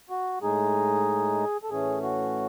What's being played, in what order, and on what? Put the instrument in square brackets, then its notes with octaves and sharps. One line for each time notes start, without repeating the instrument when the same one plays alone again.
[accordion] F#4
A2 G#3 D#4 G#4
A4
A2 E3 A3 C#4 G#4
F#4